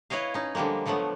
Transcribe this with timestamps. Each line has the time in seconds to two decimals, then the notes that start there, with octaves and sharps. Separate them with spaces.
0.10 E4 B4 C#5 D#5 F5
0.34 C#4 D#4
0.55 D3 F3 G3 G#3 A#3
0.86 D3 F3 F#3 A3 B3